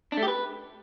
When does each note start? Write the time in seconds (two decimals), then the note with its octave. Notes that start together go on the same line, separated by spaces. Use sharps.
0.12 D4
0.17 A3
0.23 G4
0.28 B4